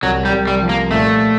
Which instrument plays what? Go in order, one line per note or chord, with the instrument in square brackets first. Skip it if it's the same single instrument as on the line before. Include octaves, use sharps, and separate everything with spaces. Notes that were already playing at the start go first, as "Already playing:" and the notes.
[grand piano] C2 [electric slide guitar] F#3
[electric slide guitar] G3
[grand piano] C2
[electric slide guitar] G3
[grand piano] F3
[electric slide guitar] A#3
[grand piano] A#2 [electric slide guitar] A3